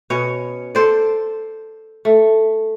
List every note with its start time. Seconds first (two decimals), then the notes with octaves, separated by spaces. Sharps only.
0.10 B2 C#4 C#5
0.75 A4 C5 D5
2.05 A3